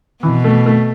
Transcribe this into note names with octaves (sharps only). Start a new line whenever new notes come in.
B2 E3
A3
A3